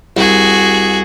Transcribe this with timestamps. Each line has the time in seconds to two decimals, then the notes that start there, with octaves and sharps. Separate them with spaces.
0.17 C2 F#4 G#4